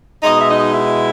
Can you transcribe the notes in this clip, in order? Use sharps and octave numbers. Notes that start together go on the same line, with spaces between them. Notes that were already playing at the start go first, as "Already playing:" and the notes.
B2 G#3 D#4 D#5
E5
D#4 D#5
E4 E5